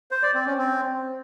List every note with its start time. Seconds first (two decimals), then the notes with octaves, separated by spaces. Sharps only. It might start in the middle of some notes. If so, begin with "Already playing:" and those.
0.11 C5
0.23 D5
0.35 C4
0.46 C#4
0.58 C4